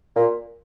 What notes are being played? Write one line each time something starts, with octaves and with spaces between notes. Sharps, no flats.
A#2